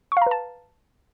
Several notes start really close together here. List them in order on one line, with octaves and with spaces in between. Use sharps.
C#6 F5 A#5 B4 A5